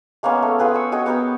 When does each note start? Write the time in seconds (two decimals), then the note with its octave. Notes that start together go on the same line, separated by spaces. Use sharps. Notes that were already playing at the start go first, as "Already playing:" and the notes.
0.23 G#3 A#3 B3 C#4
0.42 A3
0.59 F4 G#4 B4 G5
0.74 C#6 E6
0.92 F#4 G#4 D#5 G5
1.06 B3 G4 A#4 G5